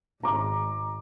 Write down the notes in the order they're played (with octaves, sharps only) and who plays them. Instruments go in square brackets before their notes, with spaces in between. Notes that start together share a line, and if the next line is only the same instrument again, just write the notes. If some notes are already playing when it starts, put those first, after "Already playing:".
[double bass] G#1 [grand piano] A#5 D6